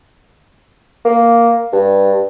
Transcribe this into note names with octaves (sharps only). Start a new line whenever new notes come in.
A#3
G2